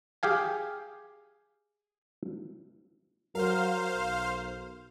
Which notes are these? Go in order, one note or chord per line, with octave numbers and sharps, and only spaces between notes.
G4 G#4 F5 G#5
F#3 A#4 C5 F5
B1